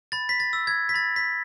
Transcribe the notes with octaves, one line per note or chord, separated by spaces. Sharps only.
B5 A6
B6
A6
E6
G#6
B6
B5 A6
B6